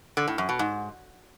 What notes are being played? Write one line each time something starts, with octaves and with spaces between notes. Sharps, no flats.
D3
A2
F#2
B2
G#2